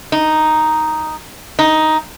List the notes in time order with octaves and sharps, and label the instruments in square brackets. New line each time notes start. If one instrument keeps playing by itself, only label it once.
[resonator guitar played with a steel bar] D#4
D#4